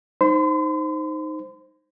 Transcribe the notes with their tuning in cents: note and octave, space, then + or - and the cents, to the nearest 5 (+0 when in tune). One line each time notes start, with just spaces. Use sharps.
D#4 +0 C5 +0 C6 -45